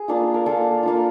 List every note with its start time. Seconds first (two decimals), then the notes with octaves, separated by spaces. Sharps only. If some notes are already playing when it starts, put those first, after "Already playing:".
Already playing: G#4
0.08 A#3 D4 F4
0.34 A#4
0.46 A#3 D4 F4 A4
0.83 A#3 D4 F4